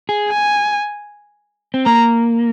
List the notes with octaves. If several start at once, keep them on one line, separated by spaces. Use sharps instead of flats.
G#4
G#5
C4
A#3 A#5